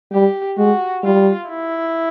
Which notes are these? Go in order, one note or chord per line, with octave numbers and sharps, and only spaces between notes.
G3 G4
G#3 F#4
G3 F4
E4